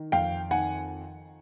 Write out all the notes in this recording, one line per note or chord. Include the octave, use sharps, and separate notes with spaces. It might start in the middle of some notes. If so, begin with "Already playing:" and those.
Already playing: D#3
F2 F5 G5
D#3 F#5 G#5